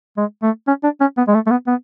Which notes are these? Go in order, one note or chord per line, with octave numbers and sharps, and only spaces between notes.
G#3
A3
C#4
D4
C#4
B3
G#3
A3
A3
B3
B3